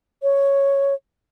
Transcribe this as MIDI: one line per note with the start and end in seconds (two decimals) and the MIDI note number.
0.23 0.94 73